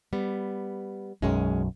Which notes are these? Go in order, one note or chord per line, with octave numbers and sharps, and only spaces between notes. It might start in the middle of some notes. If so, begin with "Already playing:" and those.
G3 B3
B1 F#2 G#3 C#4